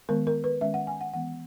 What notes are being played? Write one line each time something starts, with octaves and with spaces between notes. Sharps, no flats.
D#3 G#3 B3 A#4
A#4
B4
D#3 G#3 C#4 E5
F#5
G#5
F#5
E3 G#3 B3 F#5